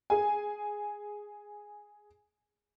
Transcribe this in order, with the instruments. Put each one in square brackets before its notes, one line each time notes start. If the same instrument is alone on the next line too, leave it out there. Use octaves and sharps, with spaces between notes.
[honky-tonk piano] G#4 G#5